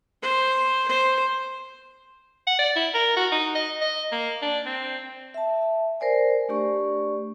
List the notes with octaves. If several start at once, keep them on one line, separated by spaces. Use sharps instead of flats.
C5
C5
F#5
D5
E4
A#4
F#4
D#4
D#5
D#5
A#3
D4
C4
E5 A5
A#4 C5 D5 G#5
A3 D4 G4 D5 C#6